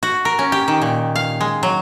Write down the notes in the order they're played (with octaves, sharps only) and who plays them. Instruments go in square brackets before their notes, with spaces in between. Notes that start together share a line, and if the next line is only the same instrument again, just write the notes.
[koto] F#4
A#4
C#4
G4
D#3
A#2
F5
G#3
F#3